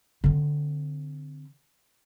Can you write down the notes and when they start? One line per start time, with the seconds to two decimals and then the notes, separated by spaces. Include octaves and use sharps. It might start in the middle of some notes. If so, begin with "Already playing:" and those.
0.24 D3 C4